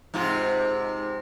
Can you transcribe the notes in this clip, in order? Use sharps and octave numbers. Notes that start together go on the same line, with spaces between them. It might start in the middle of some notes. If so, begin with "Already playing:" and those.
G#2 C3 F4